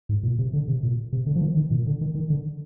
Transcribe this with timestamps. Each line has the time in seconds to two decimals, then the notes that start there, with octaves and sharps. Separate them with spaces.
0.09 G#2
0.23 A#2
0.39 C3
0.53 D3
0.68 C3
0.83 A#2
1.13 C3
1.26 D3
1.35 F3
1.41 D#3
1.57 D#3
1.71 A#2
1.86 D3
2.01 D#3
2.15 D#3
2.30 D3